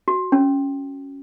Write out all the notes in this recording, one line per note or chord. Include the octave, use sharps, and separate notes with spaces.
F#4
C#4